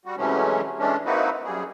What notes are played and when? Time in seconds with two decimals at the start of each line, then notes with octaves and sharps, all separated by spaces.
0.05 G3 F#4
0.17 C3 E3 F#3 G#3 A3 C#4
0.79 E3 G#3 A3 C#4 D4
1.06 A#3 C4 D#4 E4 F#4 B4
1.45 F#2 G3 G#4